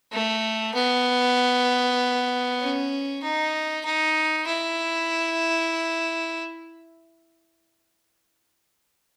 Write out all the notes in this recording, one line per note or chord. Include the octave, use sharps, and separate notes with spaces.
A3
B3
C#4
D#4
D#4
E4